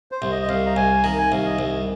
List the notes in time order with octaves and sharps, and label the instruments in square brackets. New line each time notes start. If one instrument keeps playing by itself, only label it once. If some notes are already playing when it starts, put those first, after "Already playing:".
[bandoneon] C5
[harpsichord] C2
[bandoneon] D#5
D#5
[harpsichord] C2 [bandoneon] F5
[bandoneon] A#5
[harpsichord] C2 [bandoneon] G#5
[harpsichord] D#3 [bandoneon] A#5
[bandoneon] G#5
[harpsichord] C2 [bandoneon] F5
[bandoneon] D#5
[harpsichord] C2